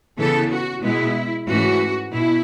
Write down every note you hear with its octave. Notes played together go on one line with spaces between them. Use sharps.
C#3 E3 B3 A4
F#4
B2 G#3 B3 E4
G#2 E3 A3 C#4 F#4
B2 E4